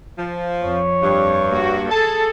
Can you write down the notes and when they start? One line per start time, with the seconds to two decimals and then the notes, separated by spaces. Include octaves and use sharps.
0.18 F3
0.61 F2 C#5
1.03 G2
1.50 A#3 F#4
1.91 G#4 A4 A5